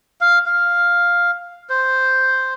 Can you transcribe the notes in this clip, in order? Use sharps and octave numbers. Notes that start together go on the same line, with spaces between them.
F5
F5
C5